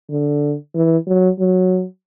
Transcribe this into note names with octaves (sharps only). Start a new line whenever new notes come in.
D3
E3
F#3
F#3